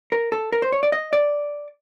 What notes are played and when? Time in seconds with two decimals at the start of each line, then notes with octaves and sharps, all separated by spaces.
0.12 A#4
0.32 A4
0.52 A#4
0.62 C5
0.72 C#5
0.83 D5
0.92 D#5
1.13 D5